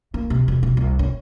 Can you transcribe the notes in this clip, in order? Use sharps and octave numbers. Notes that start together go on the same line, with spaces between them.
A#3
C3
E1
C3
C2
C#4